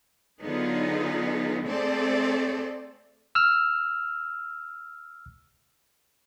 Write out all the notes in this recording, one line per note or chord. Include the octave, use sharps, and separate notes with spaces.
D3 F#3 B3 D#4 F4 G#4
A3 C4 G#4 A4 C5 D5
E6 F6